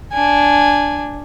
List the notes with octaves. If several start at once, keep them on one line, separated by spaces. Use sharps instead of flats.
D4 G#5